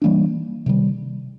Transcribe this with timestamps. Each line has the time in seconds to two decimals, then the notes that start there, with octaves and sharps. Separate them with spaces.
0.02 E3 G3 A#3 D4
0.66 C3 D#3 G3